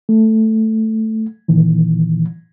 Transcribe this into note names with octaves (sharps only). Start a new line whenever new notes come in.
A3
A#2 D#3 E3